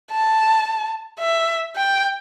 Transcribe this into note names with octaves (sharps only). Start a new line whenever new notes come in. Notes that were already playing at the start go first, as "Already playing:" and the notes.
A5
E5
G5